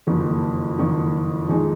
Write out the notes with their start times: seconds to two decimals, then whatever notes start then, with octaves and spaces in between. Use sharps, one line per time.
0.07 F#1 F2 D#3
0.79 F#1 F2 D#3
1.49 F2 D#3 G#3 D#4